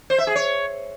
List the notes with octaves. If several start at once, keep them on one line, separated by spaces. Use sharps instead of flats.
C5
E5
G#4
C#5